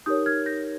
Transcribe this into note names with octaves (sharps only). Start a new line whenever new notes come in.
D#4 G4 A#4 C#5 D#6 G6
F6 G#6
G6 A#6